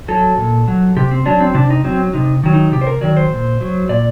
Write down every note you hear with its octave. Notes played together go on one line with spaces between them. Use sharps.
F#3 A4
A#2
F#3
C3 G4
C4
F#3 D4
C4
C3 D4
D#4
F#3 C4
C3 D#4
D#3 F#3
D#4
C3 G4
C5
A#4
D#3 F#3 D5
C5
A#2
F#3
A#2 D5